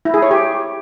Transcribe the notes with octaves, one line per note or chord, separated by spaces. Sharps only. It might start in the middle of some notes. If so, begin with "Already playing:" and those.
E4
G#4
C#5
G4